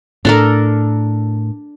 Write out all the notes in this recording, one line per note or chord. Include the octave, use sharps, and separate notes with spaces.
A2 D4 A4 A#4